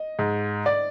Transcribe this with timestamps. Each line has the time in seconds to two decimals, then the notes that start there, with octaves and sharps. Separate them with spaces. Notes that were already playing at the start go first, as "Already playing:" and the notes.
Already playing: D#5
0.19 G#2
0.66 D5